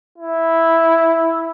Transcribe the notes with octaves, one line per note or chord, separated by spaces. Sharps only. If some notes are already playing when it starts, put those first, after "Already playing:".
E4